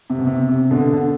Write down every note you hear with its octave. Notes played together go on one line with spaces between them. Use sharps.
C3
B2
C3
C3
B2 D3
B2 D3